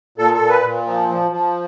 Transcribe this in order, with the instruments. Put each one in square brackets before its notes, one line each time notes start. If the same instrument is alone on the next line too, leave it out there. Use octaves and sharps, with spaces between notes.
[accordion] A#2 A4
A4
A#2
B4
A#2
F3
F3
F3